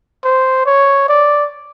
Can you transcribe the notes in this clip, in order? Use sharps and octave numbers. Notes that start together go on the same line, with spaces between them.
C5
C#5
D5